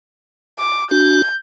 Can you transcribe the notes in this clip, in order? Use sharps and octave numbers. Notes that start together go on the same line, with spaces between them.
D6
D4 F#4 G6